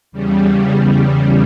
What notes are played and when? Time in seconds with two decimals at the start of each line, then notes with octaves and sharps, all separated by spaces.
0.12 E2 C#3 G3